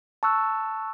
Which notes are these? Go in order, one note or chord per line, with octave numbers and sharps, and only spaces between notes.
A5 C#6 E6 F#6